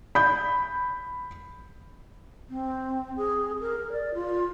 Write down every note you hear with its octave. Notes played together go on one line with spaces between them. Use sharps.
B5 G6
C4
G#4
A#4
D5
F4